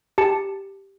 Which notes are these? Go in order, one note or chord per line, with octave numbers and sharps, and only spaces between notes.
G4 A5 C#7